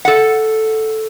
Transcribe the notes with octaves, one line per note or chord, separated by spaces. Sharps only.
A4 F#5